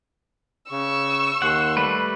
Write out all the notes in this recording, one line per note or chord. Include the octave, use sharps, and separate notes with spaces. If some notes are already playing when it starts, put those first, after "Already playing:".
C#3 C#6 E6
D#2 F#5 C6
G3 A3 B4